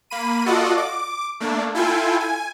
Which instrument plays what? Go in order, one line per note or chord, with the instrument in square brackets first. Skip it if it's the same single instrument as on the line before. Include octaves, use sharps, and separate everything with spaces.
[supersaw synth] A#3 B5 D#7
F4 F#4 A4 D5 D#5 F#5
D6
A3 A#3 D4
E4 F4 A4 G5 G#5
G#5